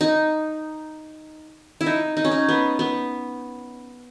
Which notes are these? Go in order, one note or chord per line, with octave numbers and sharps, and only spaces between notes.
D#4
E4
D#4
D#4
C#4
D#4
B3
B3